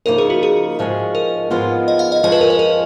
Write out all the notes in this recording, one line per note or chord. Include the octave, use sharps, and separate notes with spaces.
C#3 F3 A#3 D#4 A#4
G#4
F#4
G#4
G#2 F3 G#3 C#4
A#4
G#2 F3 G#3 B3 F4
D#5
F5
D#5
F2 F3 G#3 C#4 F4 D#5
B4
A#4
B4
A#4